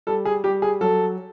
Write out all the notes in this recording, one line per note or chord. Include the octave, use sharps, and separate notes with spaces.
G3 A4
G#4
G3 G4
G#4
F#3 A4